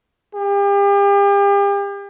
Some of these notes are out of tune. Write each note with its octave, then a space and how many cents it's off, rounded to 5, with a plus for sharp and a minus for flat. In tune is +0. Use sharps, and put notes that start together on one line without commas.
G4 +40